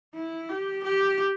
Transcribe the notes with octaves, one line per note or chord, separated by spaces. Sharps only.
E4
G4
G4